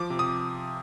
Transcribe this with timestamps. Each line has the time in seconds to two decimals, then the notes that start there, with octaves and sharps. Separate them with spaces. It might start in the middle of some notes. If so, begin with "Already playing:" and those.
Already playing: F3 D6
0.10 C3
0.19 D#6